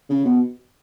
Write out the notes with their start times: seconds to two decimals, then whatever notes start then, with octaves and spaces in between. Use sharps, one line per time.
0.10 C#3
0.25 B2